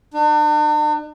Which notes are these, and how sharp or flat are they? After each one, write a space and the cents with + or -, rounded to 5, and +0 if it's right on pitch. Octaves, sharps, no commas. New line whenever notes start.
D4 +45